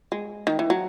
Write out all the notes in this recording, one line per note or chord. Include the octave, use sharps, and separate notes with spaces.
G#3
D#3
E3
F#3